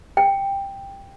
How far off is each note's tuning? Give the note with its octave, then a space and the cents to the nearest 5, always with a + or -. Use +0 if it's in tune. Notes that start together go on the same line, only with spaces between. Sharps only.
G5 +10